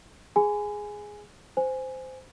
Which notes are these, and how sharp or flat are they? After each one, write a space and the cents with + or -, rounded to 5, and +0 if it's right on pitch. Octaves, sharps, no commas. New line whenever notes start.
G#4 +0 G#5 +0 B5 +45
C5 -15 G#5 +0